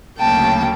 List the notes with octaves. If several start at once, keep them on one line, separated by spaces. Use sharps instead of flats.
D2 C#3 F#3 A#3 G5 A5